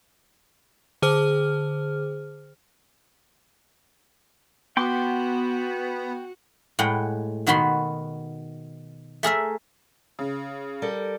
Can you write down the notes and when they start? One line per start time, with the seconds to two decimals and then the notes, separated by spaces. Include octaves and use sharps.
1.02 D3 G#4 C5 F6
4.77 B3 F#4 G5 C6 D6
6.79 A2 G#3 F#5 G5
7.47 B2 D#3 B3 F#4 B5 C6
9.23 A3 G#4 A#4 E5
10.19 C#3
10.82 G3 A4 A#4